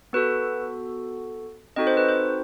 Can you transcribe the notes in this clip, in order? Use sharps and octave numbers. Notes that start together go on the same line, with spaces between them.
B3 F#4 A4 B4
C4 D#4 F#4 A4 D#5
C5
B4
C5